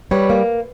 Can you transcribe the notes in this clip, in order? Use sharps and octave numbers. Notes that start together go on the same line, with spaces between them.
G3 B4 C#5
A#3